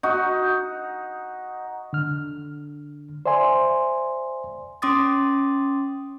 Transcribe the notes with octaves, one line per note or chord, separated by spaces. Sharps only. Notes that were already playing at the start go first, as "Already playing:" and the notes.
D#4 F#4
D3 F6
C5 D5 E5 G#5 C6
C#4 C6 D6 D#6 A6